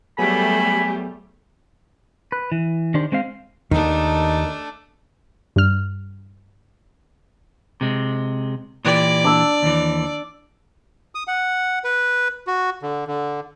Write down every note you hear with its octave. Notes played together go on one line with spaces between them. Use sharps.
F#3 G3 A3 B3 G4 G#4 G#5 B5
B4
E3
D#3 D4 G4 C5
G#3 C4 C5 F5
D#2 D#3 A3 D4 D#4
G2 F6
C3 G#3
A#2 E3 G4 D5
D4 E6
D#2 E3
D#6
F#5
B4
F#4
D3
D3